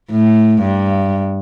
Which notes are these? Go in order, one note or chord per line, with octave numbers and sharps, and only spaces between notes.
A2
G2